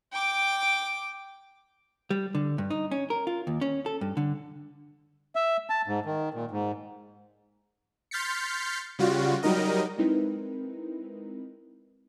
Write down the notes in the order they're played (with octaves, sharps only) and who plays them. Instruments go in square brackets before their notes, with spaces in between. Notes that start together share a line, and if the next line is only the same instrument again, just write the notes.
[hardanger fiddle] G5 D6
[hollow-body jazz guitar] G3
D3
G2
D#4
C#4
A#4
F4
D#2
C#4
A4
G2
D3
[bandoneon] E5
A5
G#2
D#3
A#2
G#2
[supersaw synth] C6 F6 G6 A6 B6 C#7
C#3 G3 F4 F#4
F#3 G3 D#4 A#4 D#5
[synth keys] G#3 C4 D#4 E4 A#4 B4